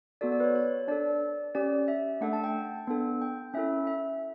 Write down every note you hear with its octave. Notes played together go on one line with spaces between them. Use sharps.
B3 F#4 A4 D5
D5
B4
C#5
C#5
D4 A4 D5
C#4 G4 D5
E5
A3 D4 A4 F#5
A5
G5
B3 D4 A4
G5
C#4 E4 A4 E5
E5